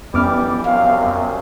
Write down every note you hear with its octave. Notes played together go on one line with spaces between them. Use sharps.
F2 E3 G3 B3 C#4 D6 F6
C2 F#2 C3 F5